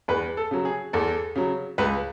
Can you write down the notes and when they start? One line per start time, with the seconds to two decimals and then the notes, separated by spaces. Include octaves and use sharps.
0.08 E2 B4
0.37 A4
0.51 C#3 F#3
0.65 G#4
0.93 E2 A4
1.36 C#3 F#3
1.78 C#2 B4